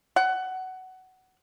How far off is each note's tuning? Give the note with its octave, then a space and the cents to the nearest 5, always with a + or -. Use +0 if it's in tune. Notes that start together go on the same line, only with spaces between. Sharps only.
F#5 +15